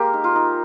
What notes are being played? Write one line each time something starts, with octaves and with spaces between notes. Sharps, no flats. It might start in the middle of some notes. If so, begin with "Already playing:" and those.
Already playing: G#3 A#3 G4 A#4
D#4
F4
D#4